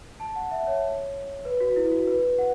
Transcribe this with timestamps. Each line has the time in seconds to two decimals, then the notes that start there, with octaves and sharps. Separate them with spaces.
0.20 A5
0.36 F#5
0.51 E5
0.67 C#5
1.45 B4
1.61 F#4
1.76 E4
1.92 F#4
2.07 B4
2.39 F#5